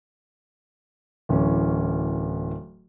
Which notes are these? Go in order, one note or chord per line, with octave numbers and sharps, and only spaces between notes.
D1 E3 C#4